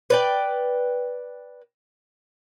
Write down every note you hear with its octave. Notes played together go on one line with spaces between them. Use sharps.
B4 D5 G5